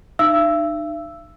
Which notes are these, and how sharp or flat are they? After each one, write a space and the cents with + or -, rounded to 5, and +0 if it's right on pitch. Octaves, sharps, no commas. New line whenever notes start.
D#4 -40 E5 +45 E6 +0